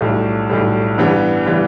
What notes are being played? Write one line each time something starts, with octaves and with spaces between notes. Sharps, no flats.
B1 A2 G3
B1 A2 G3
G2 E3 G3 B3
E3 G3 B3